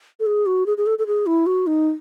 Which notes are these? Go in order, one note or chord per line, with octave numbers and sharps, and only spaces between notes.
A4
G#4
F#4
G#4
G#4
A4
A4
G#4
E4
F#4
D#4